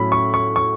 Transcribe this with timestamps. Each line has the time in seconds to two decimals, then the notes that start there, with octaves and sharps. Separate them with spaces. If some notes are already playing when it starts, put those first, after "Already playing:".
Already playing: A2 F#3 C#4 B5
0.12 C#6
0.34 C#6
0.56 C#6